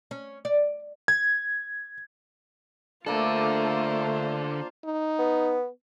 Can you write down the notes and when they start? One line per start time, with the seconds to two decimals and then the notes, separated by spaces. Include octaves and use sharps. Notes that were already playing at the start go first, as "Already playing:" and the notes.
0.11 C#4
0.45 D5
1.08 G#6
3.06 D3 A3 A#3 D4 F4 A4 C5
4.84 D#4
5.19 B3